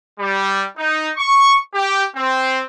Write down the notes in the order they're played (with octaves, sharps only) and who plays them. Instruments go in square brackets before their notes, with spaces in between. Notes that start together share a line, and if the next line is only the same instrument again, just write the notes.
[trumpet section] G3
D#4
C#6
G4
C4